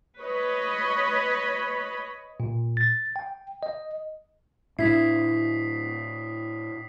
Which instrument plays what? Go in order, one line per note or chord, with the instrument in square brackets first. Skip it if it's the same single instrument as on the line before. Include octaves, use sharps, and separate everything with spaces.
[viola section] B4 C#5 D#5 B5
[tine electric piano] A#2
A6
G5
D#5
[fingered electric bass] A2 D4 [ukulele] E4 [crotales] D#6 B6 C7